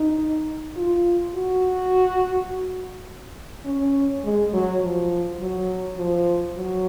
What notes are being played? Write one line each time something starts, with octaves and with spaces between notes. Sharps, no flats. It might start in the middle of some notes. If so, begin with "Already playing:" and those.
Already playing: D#4
F4
F#4
C#4
G#3
F#3
F3
F#3
F3
F#3